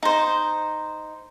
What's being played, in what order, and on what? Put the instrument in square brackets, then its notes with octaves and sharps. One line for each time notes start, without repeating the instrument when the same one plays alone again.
[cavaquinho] D#4 C5